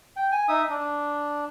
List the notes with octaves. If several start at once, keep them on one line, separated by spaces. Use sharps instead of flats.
G5
G#5
D#4 E5 D#6
D4